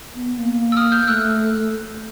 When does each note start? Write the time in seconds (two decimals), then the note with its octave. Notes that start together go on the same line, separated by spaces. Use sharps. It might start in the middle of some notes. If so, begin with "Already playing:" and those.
0.15 B3
0.38 A#3
0.72 E6
0.77 D#6 F6
0.92 F6 G6
1.03 G6
1.08 A3 E6 F#6